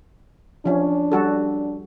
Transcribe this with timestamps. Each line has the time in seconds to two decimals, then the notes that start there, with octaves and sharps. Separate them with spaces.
0.65 F3 C#4 D4
1.12 G3 F#4 A4